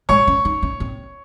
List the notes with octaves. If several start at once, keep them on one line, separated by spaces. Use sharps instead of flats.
G#3 C#5
C#4
D#4
C#4
C4